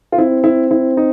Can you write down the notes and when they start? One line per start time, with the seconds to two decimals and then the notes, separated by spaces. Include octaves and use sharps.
0.12 F4
0.18 C4 E4
0.44 E4
0.71 E4
0.97 D#4